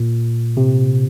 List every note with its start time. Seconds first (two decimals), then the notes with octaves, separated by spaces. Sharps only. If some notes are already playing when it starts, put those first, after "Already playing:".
Already playing: A#2
0.57 C3